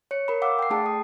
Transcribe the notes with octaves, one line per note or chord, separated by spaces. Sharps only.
C#5 C#7
A#4 B5
F5 F#5 D6 E6
G5 C7
A3 D4 G#4 G5 A5
D#6